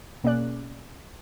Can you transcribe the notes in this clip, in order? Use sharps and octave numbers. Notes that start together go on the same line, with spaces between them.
B2 A#3 C#4 G#4 D5 F#6